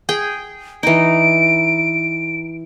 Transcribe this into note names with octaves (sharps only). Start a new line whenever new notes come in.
G#4 G5
E3 D#4 D7